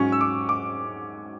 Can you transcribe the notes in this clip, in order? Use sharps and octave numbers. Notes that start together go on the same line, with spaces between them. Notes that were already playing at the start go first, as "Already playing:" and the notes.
Already playing: G#2 F#3 C#4 C#6
E6
D6
D6